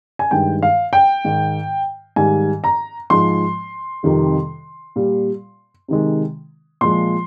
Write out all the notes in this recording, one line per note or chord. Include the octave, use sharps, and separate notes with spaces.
G#5
G2 D#3 G#3 G5
F5
G5
G#2 D#3 G#3
G#2 D#3 G3 G#5
A#5
G#2 F3 G#3 C6
F2 C3 D#3 G3
A#2 G3
C3 D#3 G#3
A#2 F3 G#3 C6